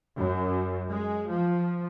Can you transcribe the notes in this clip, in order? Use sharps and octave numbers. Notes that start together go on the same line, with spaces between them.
F#2
G#3
F3